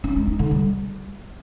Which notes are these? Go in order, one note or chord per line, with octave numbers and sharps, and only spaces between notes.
C#4
G#3
D#4
D3
G3